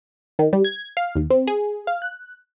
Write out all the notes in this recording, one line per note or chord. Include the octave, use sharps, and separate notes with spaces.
D#3
G3
G#6
F5
D#2
C4
G#4
F5
F#6